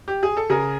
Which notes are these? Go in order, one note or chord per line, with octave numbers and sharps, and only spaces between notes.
G4
G#4
A4
C#3 G#4 A#4